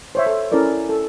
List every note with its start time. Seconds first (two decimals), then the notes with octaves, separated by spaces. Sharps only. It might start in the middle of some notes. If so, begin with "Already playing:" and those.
0.15 C5 C#5 E5
0.26 A4
0.52 C#4 E4 A4 A#4 D5
0.89 A4